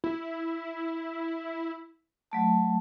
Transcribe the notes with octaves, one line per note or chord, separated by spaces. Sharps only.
E4
F#3 A3 A5